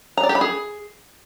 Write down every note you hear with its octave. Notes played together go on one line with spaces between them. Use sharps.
A#5
D5
G4
B5
G#4